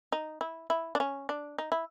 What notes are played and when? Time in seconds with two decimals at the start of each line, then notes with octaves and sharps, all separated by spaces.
0.12 D#4
0.41 E4
0.70 E4
0.95 D4
1.00 C#4
1.29 D4
1.58 D#4
1.72 E4